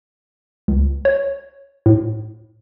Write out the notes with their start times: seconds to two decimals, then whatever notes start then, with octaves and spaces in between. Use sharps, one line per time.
0.68 C#2
1.05 C#5
1.86 A2